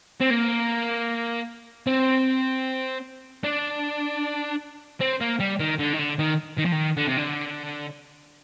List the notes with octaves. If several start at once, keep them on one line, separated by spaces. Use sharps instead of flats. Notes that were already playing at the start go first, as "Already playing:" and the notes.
C4
A#3
C4
D4
C4
A#3
G3
D#3
D3
D#3
D3
D#3
D#3
F3
D#3
D3
C3
D3